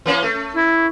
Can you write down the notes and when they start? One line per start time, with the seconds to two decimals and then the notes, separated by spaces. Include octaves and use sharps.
0.06 E3 A#3 C#4
0.23 A3
0.56 E4